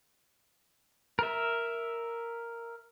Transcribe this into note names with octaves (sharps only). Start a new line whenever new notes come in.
A#4 E5